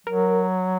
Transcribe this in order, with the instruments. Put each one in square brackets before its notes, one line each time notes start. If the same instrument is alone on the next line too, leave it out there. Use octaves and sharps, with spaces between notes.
[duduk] F#3 [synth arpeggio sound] A#4